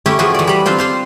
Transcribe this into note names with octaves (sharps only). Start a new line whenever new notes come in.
A3 C#4 E4 G4
E3 F3 A3 F#4 G#4
E3 D5
G3 B5
C4 D4 F4 C5
F4 C5 F5